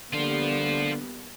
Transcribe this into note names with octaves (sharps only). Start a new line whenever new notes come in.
D3 G3 A#3 B3 F4 C5